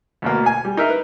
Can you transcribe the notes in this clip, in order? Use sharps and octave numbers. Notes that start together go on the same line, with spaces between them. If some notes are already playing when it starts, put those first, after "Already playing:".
D2 B2 A#3
G#5
G3
D#4 A#4 E5
B4